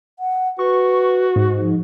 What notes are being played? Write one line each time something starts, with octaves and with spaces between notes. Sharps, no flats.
F#5
F#4 B4 C#6
G#2
F3